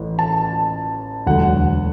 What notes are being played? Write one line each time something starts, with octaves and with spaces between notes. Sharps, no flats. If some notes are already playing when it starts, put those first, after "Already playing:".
Already playing: A1 A2 E3
A5
E1 D2 D3 F#3 F#5